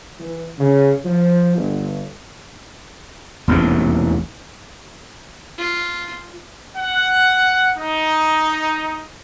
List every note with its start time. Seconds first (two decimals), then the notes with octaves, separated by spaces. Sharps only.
0.19 E3
0.58 C#3
1.04 F3
1.56 G1
3.48 E1 A1 D#2 C3
5.58 F4
6.76 F#5
7.77 D#4